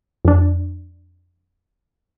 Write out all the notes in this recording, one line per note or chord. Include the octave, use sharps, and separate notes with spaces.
F2 D4